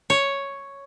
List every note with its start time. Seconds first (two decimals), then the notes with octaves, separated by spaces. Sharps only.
0.10 C#5